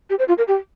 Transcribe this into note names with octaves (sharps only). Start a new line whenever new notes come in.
G4
C5
F4
A#4
G4